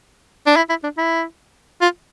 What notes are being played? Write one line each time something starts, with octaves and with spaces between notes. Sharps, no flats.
D4
E4
E4
D4
E4
F4